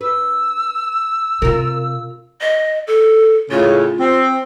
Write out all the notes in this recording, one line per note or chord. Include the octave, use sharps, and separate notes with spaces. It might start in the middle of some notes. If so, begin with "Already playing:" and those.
B4 E6
C3 F4 A#4
D#5
A4
A2 C#3 F4
C4